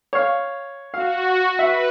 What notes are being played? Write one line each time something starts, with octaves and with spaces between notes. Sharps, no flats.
C#5 F5
F#4 F5
B4 E5